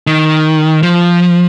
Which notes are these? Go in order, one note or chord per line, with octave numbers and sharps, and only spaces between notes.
D#3
F3